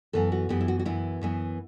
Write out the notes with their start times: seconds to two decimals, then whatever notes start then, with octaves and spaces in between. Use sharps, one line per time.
0.13 F#2 E3 B3 A4
0.32 F#4
0.49 F#2 E3 B3 G4
0.61 E4
0.68 F#4
0.79 F#4
0.85 F#2 E3 B3 E4
1.21 F#2 E3 B3